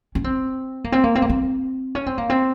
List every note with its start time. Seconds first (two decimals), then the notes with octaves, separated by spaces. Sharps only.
0.15 C#4
0.24 C4
0.84 A#3
0.92 C4
1.04 A#3
1.15 C4
1.22 A#3
1.30 C4
1.95 C#4
2.06 C4
2.18 A#3
2.30 C4